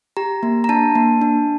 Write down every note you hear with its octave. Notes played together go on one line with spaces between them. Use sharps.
G4 A#5
A#3
A#5
D4 A5
A#3
D4